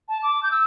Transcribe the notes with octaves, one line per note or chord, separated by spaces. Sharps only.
A5
D6
G6
E6